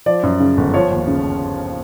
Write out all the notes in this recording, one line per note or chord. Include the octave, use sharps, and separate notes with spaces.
F3 D5
F#2
C#3
G1
F3 C#5
D#2
C#3